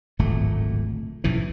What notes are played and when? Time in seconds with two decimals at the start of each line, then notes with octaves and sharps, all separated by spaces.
0.19 D1 G#1 A#2 A3
1.24 B1 F#2 A2 E3